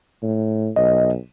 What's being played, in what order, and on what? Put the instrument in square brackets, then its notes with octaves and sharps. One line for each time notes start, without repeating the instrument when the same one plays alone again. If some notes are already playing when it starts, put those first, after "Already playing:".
[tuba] A2
[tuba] B1 [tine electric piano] D#5